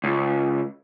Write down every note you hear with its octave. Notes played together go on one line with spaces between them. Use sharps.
C#2